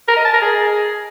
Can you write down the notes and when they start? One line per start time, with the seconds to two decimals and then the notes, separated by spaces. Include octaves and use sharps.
0.08 A#4
0.16 D#5
0.25 A5
0.33 A#4
0.42 G#4